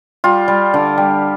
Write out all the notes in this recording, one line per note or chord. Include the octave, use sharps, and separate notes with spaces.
G3 F4
G3
D3
G3